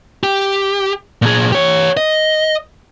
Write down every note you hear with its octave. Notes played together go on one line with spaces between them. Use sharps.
G4
A#2 G#4
G4 C#5
D#5